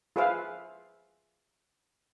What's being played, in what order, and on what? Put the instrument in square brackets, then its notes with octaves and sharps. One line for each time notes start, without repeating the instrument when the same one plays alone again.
[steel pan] F4 G#4 B4 C5 E5 F5